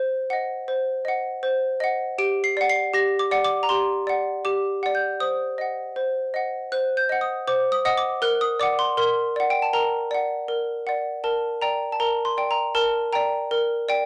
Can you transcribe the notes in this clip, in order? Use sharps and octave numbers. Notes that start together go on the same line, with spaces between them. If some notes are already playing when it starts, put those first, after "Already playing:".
Already playing: C5
D#5 F#5
C5
D#5 F#5
C5
D#5 F#5
G4 D7
C7
D5 F#5
C7
G4 A#6
D6
D5 F#5
D6
A#5
G4 C6
D5 F#5
G4 D6
D5 F#5
G6
C5 D#6
D#5 F#5
C5
D#5 F#5
C5 F#6
G6
D#5 F#5
D#6
C5 D6
D#6
D#5 F#5 D#6
D6
A#4 F#6
D#6
D5 F#5 D6
C6
A#4 C6
D5 F#5
G5
A5
A#4 A#5
D5 F#5
A#4
D5 F#5
A#4 A5
D5 G5 A#5
A5
A#4 A#5
C6
D5 G5
A#5
A#4 A5
D5 G5 A#5
A#4
D5 G5